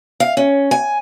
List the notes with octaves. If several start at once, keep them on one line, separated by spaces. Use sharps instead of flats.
F5
C#4
G#5